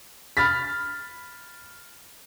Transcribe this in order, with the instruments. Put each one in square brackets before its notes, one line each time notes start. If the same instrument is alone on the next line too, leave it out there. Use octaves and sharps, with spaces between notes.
[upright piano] B5 F6 A6 B6